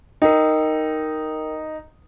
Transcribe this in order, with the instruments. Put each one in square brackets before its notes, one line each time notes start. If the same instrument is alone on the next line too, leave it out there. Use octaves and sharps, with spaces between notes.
[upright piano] D#4 [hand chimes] A#4 G5